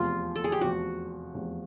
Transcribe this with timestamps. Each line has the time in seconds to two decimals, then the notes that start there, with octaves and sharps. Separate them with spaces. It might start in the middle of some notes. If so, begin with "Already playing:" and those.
Already playing: F1 E2 C3 F3 F4
0.36 A4
0.44 G#4
0.52 G4
0.61 F1 E2 C3 F3 F#4
1.34 F1 E2 C3 F3